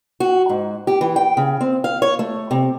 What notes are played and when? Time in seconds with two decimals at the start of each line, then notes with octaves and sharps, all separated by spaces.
0.20 F#4
0.49 G#2
0.87 G4
1.01 E3
1.16 G5
1.37 C#3
1.61 C4
1.84 F5
2.02 C#5
2.19 A3
2.51 C3